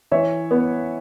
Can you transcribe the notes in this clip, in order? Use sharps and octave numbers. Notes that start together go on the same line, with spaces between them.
E3 C#5 E5
B3